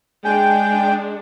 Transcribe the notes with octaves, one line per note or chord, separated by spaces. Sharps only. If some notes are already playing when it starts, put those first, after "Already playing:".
G#3 D4 G5 G#5